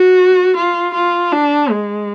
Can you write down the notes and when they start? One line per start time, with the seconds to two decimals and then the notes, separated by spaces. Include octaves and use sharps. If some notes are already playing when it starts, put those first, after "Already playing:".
Already playing: F#4
0.57 F4
0.95 F4
1.32 D4
1.71 G#3